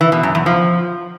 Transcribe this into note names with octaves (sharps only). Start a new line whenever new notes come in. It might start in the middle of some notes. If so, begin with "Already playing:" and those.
E3
B2
F#2
E2
F3